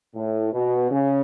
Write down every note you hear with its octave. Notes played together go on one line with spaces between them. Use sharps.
A2
B2
C#3